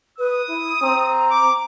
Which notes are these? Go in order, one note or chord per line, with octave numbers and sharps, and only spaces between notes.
B4 D#6
E4
C4 A#5
D6